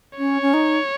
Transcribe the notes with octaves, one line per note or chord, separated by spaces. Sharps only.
C#4 C#5
C#4
D#4